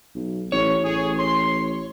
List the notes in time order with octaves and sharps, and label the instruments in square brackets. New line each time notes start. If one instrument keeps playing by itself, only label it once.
[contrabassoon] B1
[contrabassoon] A1 [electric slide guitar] C#5
[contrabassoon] A1 [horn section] G#4
[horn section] C6